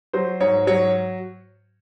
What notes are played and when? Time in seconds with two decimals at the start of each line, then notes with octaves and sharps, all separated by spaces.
0.13 F#3 C5
0.40 G#2 C#5
0.67 F#3 C#5